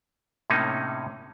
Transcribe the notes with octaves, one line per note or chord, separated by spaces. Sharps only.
A2 C3 A#3 C#4 D#4